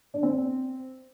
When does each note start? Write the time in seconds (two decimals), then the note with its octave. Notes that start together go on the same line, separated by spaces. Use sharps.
0.14 D4
0.23 C4